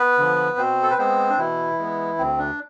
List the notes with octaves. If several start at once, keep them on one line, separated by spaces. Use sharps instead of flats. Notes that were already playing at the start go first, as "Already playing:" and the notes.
Already playing: B3 B4
D3 F3
B2 C4 C5
A4
B4
G#3 B3 C4 C5
D4
B2 E3 E4
G#3 B3
D2 C4
D4